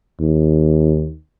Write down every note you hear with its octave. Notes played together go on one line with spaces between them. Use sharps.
D#2